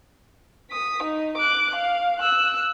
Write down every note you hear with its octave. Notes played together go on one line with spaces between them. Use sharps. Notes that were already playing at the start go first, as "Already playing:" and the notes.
D#6 B6
D#4
D6 F#6
F5
E6 F#6